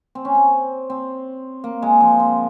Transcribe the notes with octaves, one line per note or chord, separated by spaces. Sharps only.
C4
C#4
C4
C4
A#3
G#3
F3
C4